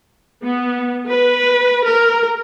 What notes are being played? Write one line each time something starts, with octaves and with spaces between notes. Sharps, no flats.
B3
B4
A#4